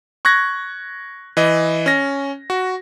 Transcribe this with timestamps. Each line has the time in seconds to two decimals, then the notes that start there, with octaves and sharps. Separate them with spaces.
0.25 C#6 F#6 G#6 A#6
1.37 E3 D#5
1.86 C#4 A#6
2.50 F#4